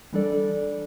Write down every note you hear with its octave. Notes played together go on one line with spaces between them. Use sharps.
E3 G3 D4 A4 D5